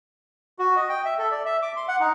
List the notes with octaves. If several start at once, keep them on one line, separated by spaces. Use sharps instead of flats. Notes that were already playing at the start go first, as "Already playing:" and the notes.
F#4
D#5
G5
E5
A4
D5
E5
D6
C6
F#5
D#4